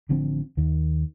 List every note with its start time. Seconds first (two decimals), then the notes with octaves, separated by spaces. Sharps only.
0.09 A1 D3 F3 C4
0.57 D#2 D#3